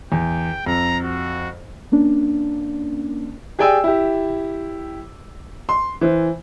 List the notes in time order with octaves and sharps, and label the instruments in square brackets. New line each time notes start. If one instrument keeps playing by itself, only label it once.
[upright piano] E2 [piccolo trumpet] G5
[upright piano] F2 [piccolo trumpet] A#5
[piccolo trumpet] F#4
[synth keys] A#3 C#4 D4
[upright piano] G4 G#4 D5 G5 G#5 E6
E4 G4
C6
E3 C5